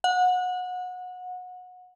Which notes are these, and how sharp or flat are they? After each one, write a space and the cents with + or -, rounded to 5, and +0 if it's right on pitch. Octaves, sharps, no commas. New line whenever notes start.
F#5 -25